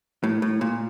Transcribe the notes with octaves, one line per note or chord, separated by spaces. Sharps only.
A2
A2
A#2